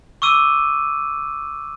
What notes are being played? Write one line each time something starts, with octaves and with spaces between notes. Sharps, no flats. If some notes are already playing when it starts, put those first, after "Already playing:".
C#6 D6 E6 D#7